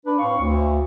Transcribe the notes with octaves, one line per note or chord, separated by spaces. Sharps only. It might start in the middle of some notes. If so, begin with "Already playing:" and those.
D4 B4
A2 C4 F5 C#6
D2